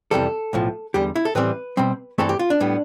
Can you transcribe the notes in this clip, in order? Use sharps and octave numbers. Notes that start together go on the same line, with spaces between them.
F2 C3 E3 G3 A4
B1 A2 F3
E2 D3 G3 G4
E4
A4
A2 E3 G3 C4 B4
B2 G3 C4
G2 E3 A3 C4 A4
G4
F4
D4
A2 G3 B3